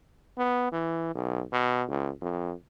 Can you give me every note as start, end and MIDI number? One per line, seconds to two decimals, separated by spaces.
0.38 0.70 59
0.72 1.15 52
1.15 1.43 35
1.52 1.83 47
1.89 2.11 37
2.21 2.53 41